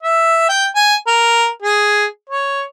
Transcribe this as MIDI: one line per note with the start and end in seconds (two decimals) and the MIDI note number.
0.03 0.49 76
0.49 0.66 79
0.76 0.95 80
1.07 1.46 70
1.62 2.05 68
2.30 2.62 73